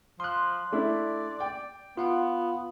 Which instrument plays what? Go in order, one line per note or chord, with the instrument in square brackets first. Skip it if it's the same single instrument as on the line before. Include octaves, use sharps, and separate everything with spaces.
[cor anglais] F3 [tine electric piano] C6 F#6
[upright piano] A3 D4 E4 [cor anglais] D5
[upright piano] G5
[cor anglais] B3 [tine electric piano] F4 F5 F#5